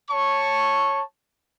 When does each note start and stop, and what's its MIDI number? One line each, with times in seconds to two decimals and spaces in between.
0.11 1.01 73
0.11 1.01 81
0.11 1.01 85